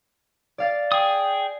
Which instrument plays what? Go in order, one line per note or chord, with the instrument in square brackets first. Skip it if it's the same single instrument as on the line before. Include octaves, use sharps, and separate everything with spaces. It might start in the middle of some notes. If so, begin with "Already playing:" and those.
[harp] D5 F5 A6
[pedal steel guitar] G#4 D#6 [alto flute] G5